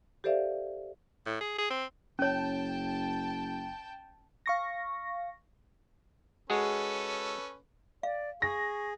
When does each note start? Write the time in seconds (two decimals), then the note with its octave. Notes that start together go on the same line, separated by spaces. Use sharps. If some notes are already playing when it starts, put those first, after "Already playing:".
0.24 G4 A4 C5 D5 E5 F5
1.26 A2
1.41 G#4
1.58 G#4
1.70 C4
2.19 F#1 C#4 C#5 G5 A5
4.46 F5 C#6 A#6
6.50 G#3 C#4 F#4 G#4 A4 B4
8.03 D5 F5
8.42 G#4 C#6 A#6